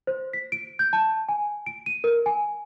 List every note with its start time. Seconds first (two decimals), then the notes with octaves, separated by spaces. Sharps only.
0.07 C5
0.33 B6
0.52 D7
0.79 G6
0.93 A5
1.29 G#5
1.66 D7
1.86 D#7
2.04 A#4
2.26 G#5